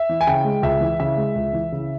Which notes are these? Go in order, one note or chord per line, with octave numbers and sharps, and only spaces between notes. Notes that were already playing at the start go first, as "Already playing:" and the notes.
Already playing: E5
E3
G#5
C#3 G5
G#3
C#2 E5
E3
C#3 E5
G#3
C#2
E3
C#3